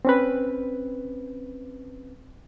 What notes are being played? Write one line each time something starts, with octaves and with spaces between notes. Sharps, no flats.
C4 C#4 B4